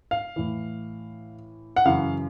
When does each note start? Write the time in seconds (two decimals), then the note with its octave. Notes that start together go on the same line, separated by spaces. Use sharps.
0.11 F5
0.36 A2 E3
1.76 F#5
1.85 F#2 C#3 E3 F5